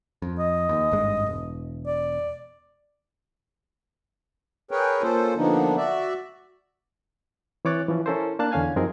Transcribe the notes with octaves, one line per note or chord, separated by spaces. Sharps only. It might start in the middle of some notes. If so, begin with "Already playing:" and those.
F2
D#5
D#2
G#1 G2 G#3
E1
D5
G#4 A#4 B4 C#5 G5
A#3 C#4 F4 A4 C5
D3 F3 A#3 B3 D4 D#4
F#4 D5 E5
E3 C4 C#5 D6 F#6 A6
E3 F3 C#4
C#4 E4 A4 A#4 C5
A#3 D4 F5 A5 F#6
E2 D3 C#4 F5 G#5 G#6
F#2 F3 C4 D#4 G#4 A#4